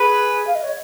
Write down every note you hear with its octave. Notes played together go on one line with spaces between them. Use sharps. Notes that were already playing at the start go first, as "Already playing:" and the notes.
Already playing: G#4 B4
F5
D#5
C#5